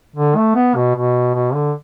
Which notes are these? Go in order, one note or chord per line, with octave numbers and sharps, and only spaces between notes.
D3
A3
B3
B2
B2
B2
D3